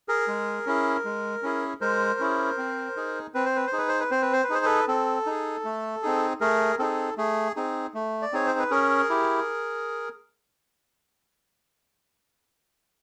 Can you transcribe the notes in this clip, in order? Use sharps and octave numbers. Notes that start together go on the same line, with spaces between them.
G#4 A#4
G#3
C#4 E4 G#4
G#3
C#4 E4 G#4
G#3 A#4 C5
C#4 E4 G#4
C4
D#4 G#4
C4 B4
C5
B4
C5
D#4 G#4
B4
C5
B4
C4 C5
B4
C5
B4
D#4 G#4 C5
A4 B4
C4 A4
D#4 G#4
A3
C4 D#4 G#4
A3 G#4 A#4
C4 D#4 G#4 A4
A3 G#4
C4 D#4 G#4
A3
D5
C4 D#4 G#4 C#5
C5
B4
C#4 G#4 A#4
E4 G4